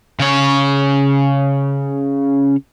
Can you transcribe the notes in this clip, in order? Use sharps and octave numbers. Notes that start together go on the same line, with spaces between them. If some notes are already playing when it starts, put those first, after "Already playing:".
C#3 C#5